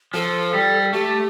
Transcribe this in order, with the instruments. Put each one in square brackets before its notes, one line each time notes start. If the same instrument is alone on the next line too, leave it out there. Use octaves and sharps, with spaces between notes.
[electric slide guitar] F3 [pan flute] A4
[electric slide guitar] G3
[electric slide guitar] A3 [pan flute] G4